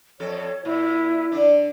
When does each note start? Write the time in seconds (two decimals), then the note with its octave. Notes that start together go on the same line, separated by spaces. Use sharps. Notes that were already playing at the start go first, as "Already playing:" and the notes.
0.20 F2 A4 C#5
0.65 A#2 E4
1.32 D3 D4